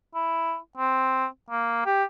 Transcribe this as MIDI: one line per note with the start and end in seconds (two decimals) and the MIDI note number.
0.15 0.57 64
0.78 1.26 60
1.51 1.82 58
1.86 2.04 67